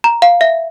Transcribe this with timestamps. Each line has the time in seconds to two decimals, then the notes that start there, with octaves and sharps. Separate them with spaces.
0.04 A#5
0.22 F5
0.41 E5